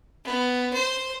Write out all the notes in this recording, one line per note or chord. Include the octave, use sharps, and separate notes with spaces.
B3
C5